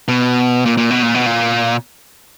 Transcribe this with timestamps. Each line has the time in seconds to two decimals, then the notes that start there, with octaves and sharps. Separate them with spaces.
0.08 B2
0.66 A#2
0.77 A#2
0.91 B2
1.03 A#2
1.14 B2
1.26 A#2